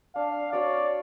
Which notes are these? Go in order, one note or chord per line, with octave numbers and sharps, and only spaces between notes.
D4 F5
F#4 C#5 D5 F5